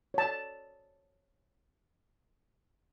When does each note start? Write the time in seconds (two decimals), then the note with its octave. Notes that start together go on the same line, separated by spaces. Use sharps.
0.14 C#5 A5